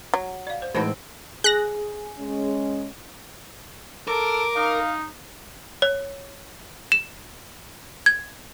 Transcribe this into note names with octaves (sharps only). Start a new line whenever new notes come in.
F#3
D5 F5
C5
A2 E3 G#3 C4 D#4 F#4 B4 A5
G#4 F#6 A#6
G#3 C#4
A4 A#4 D6
D#4 F5
C#5
E7
G#6